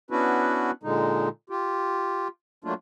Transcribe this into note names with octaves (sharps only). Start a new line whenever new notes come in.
B3 C#4 D4 E4 F#4 B4
A#2 D3 G#3 D#4
F4 G4
F#3 A3 A#3 D4 F4